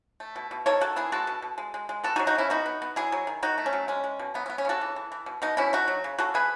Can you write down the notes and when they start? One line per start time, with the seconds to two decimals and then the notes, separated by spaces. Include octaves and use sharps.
0.20 A3
0.36 B2
0.51 B2
0.66 D#3 A4 C#5
0.81 D#3 F#4 A4
0.96 B3 E4 G#4
1.12 G#3 F#4 A4
1.27 B2
1.42 B2
1.58 G#3
1.74 G#3
1.89 G#3
2.03 B3 F#4 A4
2.16 D#4 F#4
2.19 F#3
2.27 D#4 F#4
2.35 C#3 C#4 E4
2.50 B3 D#4 F#4
2.66 B3
2.82 B3
2.96 F#3 E4 G#4
3.12 F#3
3.27 D#3
3.42 D#3 D#4 F#4
3.58 A3
3.66 C#4
3.73 F#3
3.88 G#3 C#4
4.04 G#3
4.19 B2
4.34 F#3 B3
4.46 C#4
4.50 B3
4.58 C#4
4.65 C#3 F#4 A4
4.81 E3
4.96 E3
5.12 E3
5.26 B2
5.42 B2 B3 D#4
5.57 B2 C#4 E4
5.73 A3 D#4 F#4
5.88 F#3
6.04 C#3
6.19 C#3 F#4 A4
6.34 B3 G#4 B4